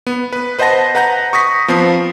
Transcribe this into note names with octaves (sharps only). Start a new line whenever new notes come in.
B3
B4
B4 C5 D#5 F#5 A5 A#6
B4 F#5 A#5 G6 A#6
C#6 D#6 A#6 B6
F3 B3 C4 A5 C7